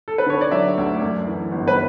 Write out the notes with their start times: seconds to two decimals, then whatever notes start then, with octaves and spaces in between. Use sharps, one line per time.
0.08 A4
0.18 B4
0.26 D3 C#5
0.41 D5
0.51 F#3 E5
0.78 D2
1.01 F#2
1.27 E3
1.52 G1
1.68 B4